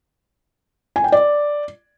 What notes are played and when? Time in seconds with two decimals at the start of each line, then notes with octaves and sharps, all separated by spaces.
0.96 G#5
1.04 G5
1.12 D5